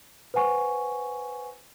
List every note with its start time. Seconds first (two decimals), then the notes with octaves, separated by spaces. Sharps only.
0.34 B4 C5 F#5 G#5 C#6